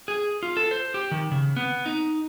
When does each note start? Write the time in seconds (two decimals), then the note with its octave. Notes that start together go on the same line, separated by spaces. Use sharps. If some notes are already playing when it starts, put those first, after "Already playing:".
0.08 G#4
0.43 F4
0.57 A4
0.71 C5
0.94 G4
1.11 D#3
1.31 C#3
1.57 B3
1.86 D#4